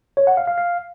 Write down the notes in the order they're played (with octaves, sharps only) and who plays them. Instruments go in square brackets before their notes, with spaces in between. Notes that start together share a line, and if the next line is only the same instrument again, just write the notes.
[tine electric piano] C#5
F#5
F5
F5
F5